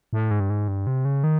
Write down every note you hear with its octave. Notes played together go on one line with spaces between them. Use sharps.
A2
G#2
G2
G#2
G2
C3
C#3
D#3